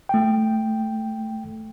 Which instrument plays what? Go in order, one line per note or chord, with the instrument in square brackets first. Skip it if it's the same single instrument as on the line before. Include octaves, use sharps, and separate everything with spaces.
[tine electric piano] A3 G5